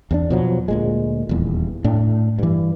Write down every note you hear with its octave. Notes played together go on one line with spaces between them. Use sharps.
E2 C4 D4
B2 F3 F#3
D2 A#2 G#3
D#1 E2
A2 D4
G2 E3